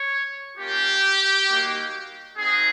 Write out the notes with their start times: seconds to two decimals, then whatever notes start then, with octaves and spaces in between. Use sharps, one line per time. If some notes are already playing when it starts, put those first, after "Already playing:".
Already playing: C#5
0.57 A#3 C#4 F4 G4
1.48 G3 A#3 D#4 F#4
2.37 C4 D#4 F#4 G#4